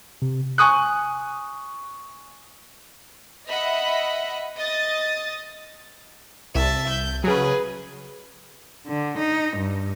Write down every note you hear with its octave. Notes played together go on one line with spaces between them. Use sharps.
C3
G#5 C#6 D#6 F#6
D#5 E5 F#5 B5
D#5 D#6 A6
C2 E5 A5
G6
C#3 F#3 G#4 B4
D3
D#4
G2